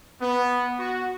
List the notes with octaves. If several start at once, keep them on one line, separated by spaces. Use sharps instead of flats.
B3
F#4